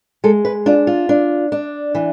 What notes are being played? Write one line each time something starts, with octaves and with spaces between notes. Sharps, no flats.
G#3 A4
B4
D4 F4
F4
D4
D4
E3